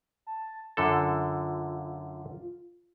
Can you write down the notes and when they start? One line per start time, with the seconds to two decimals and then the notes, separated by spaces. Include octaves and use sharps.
0.27 A5
0.77 F#2 D3 F4 A4